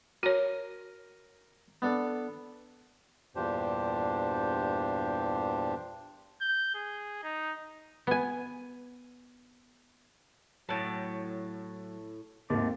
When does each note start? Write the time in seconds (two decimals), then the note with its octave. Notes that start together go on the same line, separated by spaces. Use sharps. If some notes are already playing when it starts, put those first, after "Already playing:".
0.23 F#4 A#4 C#5
1.82 B3 D4 A4
3.36 E2 G2 A#2 D4 G4 C5
6.41 G6
6.75 G#4
7.23 D#4
8.07 B3 G#5
10.69 A2 F#3 F#5 G5 A5
12.50 G#1 D#2 A3 D5